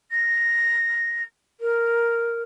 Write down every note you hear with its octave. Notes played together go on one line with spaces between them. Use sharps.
A#6
A#4